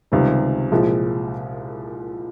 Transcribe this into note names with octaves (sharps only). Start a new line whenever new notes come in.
C#2 C3 D#3 G3
C2 A#2 F3 G#3